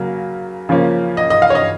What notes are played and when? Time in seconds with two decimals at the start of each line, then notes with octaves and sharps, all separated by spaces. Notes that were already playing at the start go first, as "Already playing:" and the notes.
Already playing: C#3 F#3 A#3
0.69 C#3 F3 A#3 C#4
1.17 D#5
1.30 D#5
1.42 F5
1.50 C#5
1.55 D#5